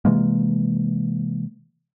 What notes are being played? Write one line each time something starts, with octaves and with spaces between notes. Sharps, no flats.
C3 E3 G#3 A#3